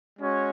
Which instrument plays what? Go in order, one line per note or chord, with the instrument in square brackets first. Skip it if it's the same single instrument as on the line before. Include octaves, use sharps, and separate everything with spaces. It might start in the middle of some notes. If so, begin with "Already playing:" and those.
[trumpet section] G#3 C#4 F#4 C#5